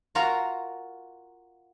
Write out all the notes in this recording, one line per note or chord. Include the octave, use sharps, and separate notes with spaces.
F4 F#4 A#4 A#5